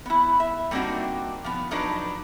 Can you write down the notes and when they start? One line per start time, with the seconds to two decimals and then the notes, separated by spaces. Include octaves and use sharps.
0.06 B3 E4
0.40 E5
0.71 G3 A#3 C4 D4 D#4 F#4
1.44 F3 B3
1.71 F3 F#3 D4 D#4 B4